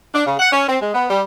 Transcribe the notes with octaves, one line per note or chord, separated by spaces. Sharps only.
D4
C#3
F#5
C#4
C4
G#3
B3
G3